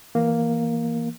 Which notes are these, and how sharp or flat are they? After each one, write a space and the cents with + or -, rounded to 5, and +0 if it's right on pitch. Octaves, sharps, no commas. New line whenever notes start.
E3 +0 A#3 +0